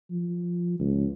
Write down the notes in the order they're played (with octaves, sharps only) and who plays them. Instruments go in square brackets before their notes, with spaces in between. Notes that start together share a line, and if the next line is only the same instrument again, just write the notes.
[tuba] F3
C#2